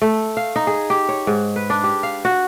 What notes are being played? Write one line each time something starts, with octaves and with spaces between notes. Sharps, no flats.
A3
F5
D#4
G#4
G4
C#5
G#2
B4
D4
G4
F5
F#4